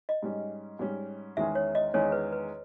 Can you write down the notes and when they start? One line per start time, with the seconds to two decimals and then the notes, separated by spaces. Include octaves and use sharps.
0.09 D#5
0.22 G#2 G3 C#4
0.79 G#2 G3 C#4
1.37 E2 D#3 G#3 C#4 G#4 E5
1.55 C#5
1.75 D#5
1.94 E2 D#3 G#3 C#4 G#4 C#5
2.12 B4
2.32 B4